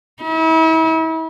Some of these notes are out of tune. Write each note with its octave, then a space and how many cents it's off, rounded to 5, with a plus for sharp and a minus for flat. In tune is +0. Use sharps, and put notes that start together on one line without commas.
E4 -40